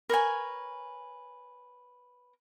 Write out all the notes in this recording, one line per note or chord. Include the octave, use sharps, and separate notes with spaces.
A#4 B4 C#5 G#5